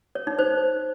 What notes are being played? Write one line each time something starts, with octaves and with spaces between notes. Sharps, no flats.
C#5
D#4
C5